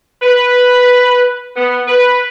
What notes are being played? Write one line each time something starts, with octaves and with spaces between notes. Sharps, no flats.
B4
B3
B4